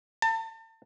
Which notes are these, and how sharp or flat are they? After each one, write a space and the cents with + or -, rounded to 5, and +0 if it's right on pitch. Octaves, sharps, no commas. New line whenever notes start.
A5 +35